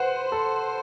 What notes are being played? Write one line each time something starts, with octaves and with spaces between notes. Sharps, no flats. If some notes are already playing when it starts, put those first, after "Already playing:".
Already playing: B4 C5 F#5
A4